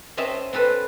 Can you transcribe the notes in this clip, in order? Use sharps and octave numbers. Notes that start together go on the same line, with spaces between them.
C4 C#4 D#5 E5 A5
C4 C#4 A4 B4